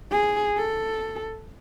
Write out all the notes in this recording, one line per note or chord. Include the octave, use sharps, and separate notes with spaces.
G#4
A4